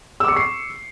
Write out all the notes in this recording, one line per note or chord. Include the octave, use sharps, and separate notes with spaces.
C#6 D6 E6 C7 C#7